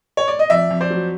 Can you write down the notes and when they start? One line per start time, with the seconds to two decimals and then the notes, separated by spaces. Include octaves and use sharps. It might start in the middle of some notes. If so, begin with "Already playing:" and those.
0.17 C#5
0.28 D5
0.39 D#5
0.50 F2 D5 E5
0.70 F2
0.81 C5 D5
0.90 F#3